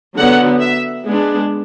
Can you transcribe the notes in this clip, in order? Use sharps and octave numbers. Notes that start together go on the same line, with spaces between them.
D3 F#3 B3 F#5
E5
G#3 B3 D4